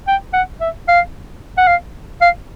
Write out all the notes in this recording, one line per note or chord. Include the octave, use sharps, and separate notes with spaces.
G5
F#5
E5
F5
F#5
F5
F5